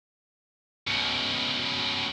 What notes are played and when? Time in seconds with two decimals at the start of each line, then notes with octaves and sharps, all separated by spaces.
0.87 C#2 B2